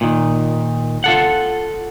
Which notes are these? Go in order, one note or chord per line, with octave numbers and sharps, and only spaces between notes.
A#2 D#3
F4 A4 F#5